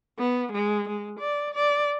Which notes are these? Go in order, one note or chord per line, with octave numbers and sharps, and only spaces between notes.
B3
G#3
G#3
D5
D5